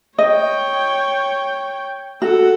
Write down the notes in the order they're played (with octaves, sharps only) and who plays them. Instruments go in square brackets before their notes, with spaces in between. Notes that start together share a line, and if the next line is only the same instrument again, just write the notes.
[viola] C#5 G5 [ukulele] D#5
[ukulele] F#4 [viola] A4 F#5